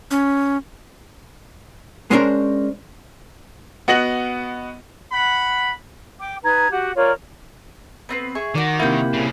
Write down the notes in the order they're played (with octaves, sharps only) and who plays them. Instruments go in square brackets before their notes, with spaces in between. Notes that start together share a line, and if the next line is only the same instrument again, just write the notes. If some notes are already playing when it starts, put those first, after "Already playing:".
[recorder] C#4
[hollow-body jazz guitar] G#3 B3 C#4 D4 A#4 C5
[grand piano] B3 F#4 D#5 A#6 F#7
[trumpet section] F#5 B5
[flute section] G5 D6
D#4 B4 A#5 G#6
F#4 G4 F#5
F4 A#4 C#5 D5
[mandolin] B3 C4 B4
G#4 E5 C#6
[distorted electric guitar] D#3 [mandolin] F#4 D5
[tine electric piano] C3 A#3 E4 [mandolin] F#5 G5
[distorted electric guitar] C2 C#3